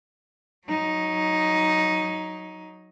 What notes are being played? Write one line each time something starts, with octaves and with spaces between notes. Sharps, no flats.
F#3 D#4